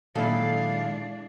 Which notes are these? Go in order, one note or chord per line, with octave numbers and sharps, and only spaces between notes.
A#2 D#3 F#3 G#3 D4 E4 A4 F5